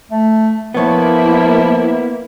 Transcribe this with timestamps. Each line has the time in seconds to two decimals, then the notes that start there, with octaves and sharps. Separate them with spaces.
0.11 A3
0.74 F3 A#3 B3 E4 C#5